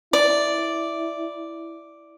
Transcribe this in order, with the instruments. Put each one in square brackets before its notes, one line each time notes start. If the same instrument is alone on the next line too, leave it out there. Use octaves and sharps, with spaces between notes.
[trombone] E4 [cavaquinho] D5